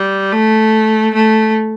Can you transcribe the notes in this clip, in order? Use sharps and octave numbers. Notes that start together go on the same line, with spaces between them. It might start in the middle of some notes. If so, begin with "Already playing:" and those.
Already playing: G3
A3
A3